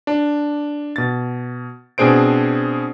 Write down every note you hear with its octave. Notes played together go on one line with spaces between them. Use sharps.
D4
B2 A6
B2 C4 D4 G#4 C5 D7